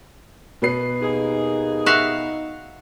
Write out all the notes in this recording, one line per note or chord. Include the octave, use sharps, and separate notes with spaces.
B2 B4 C7
D#2 A#3 D#4 G#4
F#4 E5 F5